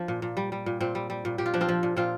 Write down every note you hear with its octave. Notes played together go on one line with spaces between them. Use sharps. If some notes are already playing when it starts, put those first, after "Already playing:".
Already playing: F3 D4
A#2
A#2
G3
G3
A#2
A#2 C4
G3
G3
A#2
A#2 G4
F4
F3 D4
C4 F4
F3
A#2
A#2 C4 F4